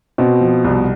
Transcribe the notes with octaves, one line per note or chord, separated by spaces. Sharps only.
B2 C4
F3
C2